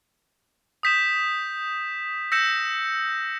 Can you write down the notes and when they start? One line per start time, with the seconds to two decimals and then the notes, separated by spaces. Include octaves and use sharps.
0.83 D#6 G6 B6 E7
2.32 E6 G6 A#6 C#7 E7